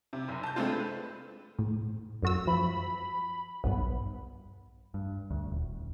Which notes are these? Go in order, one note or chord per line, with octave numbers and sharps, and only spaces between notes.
C3
F#1
A5 G6
G#3 A3 C4 D4 F4
B4
A2
F#2 F#4 E6
F3 B5
B1 G2 B3
G2
D2
D#1